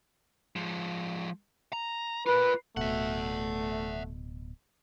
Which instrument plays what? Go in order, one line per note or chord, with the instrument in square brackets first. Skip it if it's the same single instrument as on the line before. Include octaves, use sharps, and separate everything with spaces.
[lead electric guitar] F3 G#3
A#5
[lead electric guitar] F4 A#4 [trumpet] B4
[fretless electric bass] D1 B2 [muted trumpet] A3 [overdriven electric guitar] E5 F#5